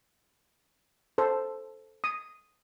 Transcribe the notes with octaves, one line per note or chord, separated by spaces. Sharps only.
A4 C5
D#6